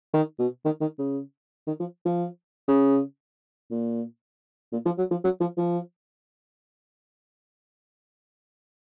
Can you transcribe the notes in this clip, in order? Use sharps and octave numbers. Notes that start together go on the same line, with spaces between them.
D#3
B2
D#3
D#3
C#3
D#3
F3
F3
C#3
A#2
A#2
F3
F#3
F3
F#3
F3
F3